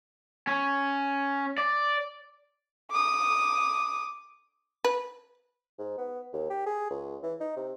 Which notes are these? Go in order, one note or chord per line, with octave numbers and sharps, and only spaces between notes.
C#4
D5
D6 D#6
B4
G#2
B3
D#2
G4
G#4
C#2
E3
D#4
C3